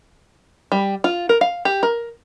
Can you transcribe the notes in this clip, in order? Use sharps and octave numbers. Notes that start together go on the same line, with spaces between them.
G3
F4
A#4
F5
G4
A#4